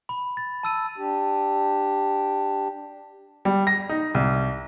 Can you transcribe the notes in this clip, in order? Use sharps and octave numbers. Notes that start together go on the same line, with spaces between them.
B5
A6
A5 E6 D#7
D4 G4
G3
A#6
D#4
C2